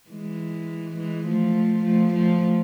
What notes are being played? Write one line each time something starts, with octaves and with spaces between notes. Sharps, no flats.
E3 G#3
E3 G#3
F3 A3
F3 A3
F3 A3